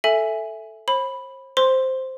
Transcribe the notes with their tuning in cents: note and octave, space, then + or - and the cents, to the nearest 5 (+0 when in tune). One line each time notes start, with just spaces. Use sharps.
A4 +0 E5 +0 G#5 +0
C5 +40 B5 +0
C5 +0 C6 +0